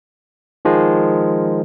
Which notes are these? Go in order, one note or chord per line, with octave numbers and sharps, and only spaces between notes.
D#3 F3 G#3